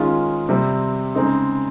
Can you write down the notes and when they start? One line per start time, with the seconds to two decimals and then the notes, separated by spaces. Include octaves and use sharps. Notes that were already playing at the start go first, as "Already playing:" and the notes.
Already playing: D#3 G#3 C#4 F4 G#4
0.49 C3 G3 C4
1.15 C#3 G#3 C4 D#4